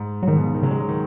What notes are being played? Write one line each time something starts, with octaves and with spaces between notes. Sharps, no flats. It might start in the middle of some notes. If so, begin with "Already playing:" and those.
Already playing: G#2
F#3
G#2 D#3
B2
C#3
D#3
C#3 F#3
G#3
F#3
D#3